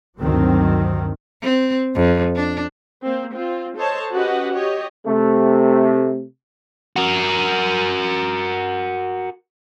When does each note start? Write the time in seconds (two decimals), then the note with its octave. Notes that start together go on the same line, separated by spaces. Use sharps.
0.20 D2 G2 D#3 F#3 C4
1.42 C4
1.95 F2
2.36 D4
3.02 A#3 C4
3.33 C4 F4
3.77 A4 C5 C#5 D#5 A5
4.13 C#4 F#4 G4 B4 D#5 F#5
4.54 G4 C#5 D#5
5.06 C3 A3
6.96 F#4 A#4